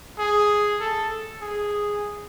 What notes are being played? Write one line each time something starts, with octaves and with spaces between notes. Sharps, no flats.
G#4
A4
G#4